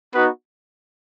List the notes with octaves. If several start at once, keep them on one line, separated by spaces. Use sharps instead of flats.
B3 D#4 F#4 B4